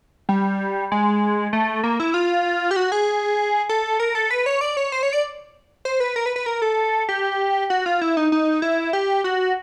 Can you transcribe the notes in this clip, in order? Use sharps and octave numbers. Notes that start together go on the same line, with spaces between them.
G3
G#3
A3
A#3
E4
F4
G4
F#4
G#4
A4
A#4
A4
B4
C#5
D5
C#5
C5
C#5
D5
C5
B4
A#4
B4
B4
A#4
A4
G4
F#4
F4
E4
D#4
D#4
E4
G4
F#4